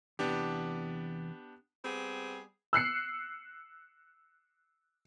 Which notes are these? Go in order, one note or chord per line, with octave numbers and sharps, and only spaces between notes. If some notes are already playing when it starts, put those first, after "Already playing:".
E2 C3 E3 B3 D4 G4
G3 B3 C4 G#4
E6 F#6 C7 C#7